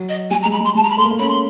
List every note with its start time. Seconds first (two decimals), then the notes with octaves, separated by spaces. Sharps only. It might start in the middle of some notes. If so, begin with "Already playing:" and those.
Already playing: F#3
0.09 D#5
0.30 G3 G#5
0.42 A#5
0.45 G#3
0.52 B5
0.60 G#3
0.64 C6
0.75 G#3 A5
0.82 A#5
0.89 B5
0.97 A3 C6
1.04 A#3
1.11 A3
1.19 C#4 B5
1.29 C6